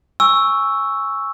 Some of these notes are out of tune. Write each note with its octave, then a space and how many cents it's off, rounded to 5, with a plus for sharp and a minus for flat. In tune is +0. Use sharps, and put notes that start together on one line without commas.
G#5 -10 C#6 +0 E6 +0